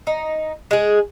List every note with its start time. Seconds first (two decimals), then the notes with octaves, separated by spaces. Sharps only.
0.07 D#4
0.71 G#3 G#4